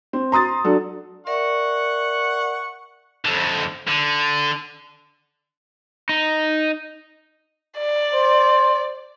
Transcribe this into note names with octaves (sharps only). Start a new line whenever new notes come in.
C4
A#5 C6 D#6 A6
F#3 D4 A4
A#4 D5 E5 F#5 C#6
F2 D3
D3
D#4
D5
C5